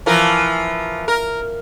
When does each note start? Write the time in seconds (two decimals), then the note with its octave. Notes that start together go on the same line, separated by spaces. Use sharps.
0.06 E3 F3 A#4
1.08 A#4